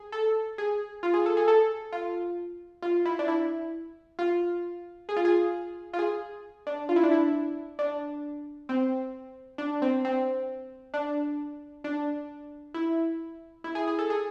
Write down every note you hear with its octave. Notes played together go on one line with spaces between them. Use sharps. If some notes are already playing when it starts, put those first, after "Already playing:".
Already playing: G#4
A4
G#4
F4
G#4
A4
G#4
A4
F4
F4
E4
D4
E4
F4
G#4
F4
G#4
F4
G#4
D4
F4
E4
D4
E4
D4
C4
D4
C4
C4
D4
D4
E4
E4
G#4
G#4
A4
G#4